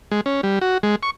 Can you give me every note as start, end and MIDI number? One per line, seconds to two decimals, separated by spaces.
0.11 0.21 56
0.26 0.41 61
0.43 0.59 55
0.61 0.78 66
0.83 0.96 56
1.03 1.10 85